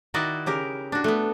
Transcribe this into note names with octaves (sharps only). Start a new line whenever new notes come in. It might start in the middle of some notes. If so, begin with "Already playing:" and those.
D#3 E4 F#4 D5 D#5
C#3 G4 A#4
D4 F#4
A3 B3